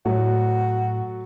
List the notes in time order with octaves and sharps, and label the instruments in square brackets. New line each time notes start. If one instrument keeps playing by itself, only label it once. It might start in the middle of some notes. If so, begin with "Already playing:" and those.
[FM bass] A2 [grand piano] F#3 A3 [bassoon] F#4